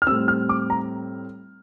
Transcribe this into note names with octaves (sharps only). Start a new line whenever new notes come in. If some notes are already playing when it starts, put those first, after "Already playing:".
F6
A2 G3 C4 E6
F6
D6
A#5